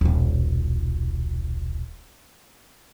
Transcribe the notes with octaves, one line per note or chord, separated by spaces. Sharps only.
D#1 B1